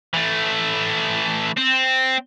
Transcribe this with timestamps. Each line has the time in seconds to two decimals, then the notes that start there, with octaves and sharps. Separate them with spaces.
0.14 E3 A3
1.57 C4